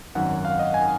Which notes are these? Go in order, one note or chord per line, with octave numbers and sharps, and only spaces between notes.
G#1 F#2 D#3 F#3 F#5
F5
D#5
G#5